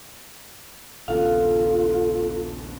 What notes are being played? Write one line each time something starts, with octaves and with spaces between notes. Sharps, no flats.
A#1 D#2 C#3 B3 D4 F4 A4 F5